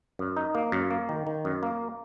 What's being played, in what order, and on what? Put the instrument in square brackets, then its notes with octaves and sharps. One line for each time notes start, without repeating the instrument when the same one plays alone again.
[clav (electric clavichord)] F#2
D#4
A#3
F#2
A#3
D#3
D#3
F#2
A#3